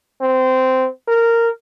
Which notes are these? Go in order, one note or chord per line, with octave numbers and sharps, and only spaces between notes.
C4
A#4